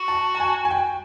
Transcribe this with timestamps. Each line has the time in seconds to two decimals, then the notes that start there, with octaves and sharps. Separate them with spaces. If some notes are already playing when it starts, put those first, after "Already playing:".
Already playing: F#4
0.08 A5
0.35 A5
0.40 G#5
0.65 G#5
0.70 G5